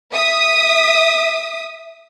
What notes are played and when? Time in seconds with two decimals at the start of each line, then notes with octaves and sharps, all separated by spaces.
0.12 E5 D#6 B6